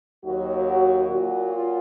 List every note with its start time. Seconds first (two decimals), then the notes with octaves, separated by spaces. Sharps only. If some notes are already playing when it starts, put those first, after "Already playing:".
0.25 D#2 D#3 F#3 F#4
0.67 F#4
1.08 A#2 F#3 F#4
1.50 F4